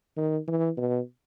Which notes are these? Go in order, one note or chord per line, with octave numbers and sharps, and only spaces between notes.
D#3
E3
B2